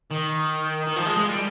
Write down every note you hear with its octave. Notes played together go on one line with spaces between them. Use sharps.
D#3
D#3
F3
G#3
G#3
G3